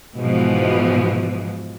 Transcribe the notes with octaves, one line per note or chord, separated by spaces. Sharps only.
G#2 B2 E3 F3